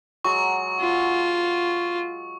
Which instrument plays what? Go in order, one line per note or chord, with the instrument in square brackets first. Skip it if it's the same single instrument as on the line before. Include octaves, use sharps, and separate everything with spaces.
[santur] F#3 G#3 F#4 [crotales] C#6
[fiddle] F4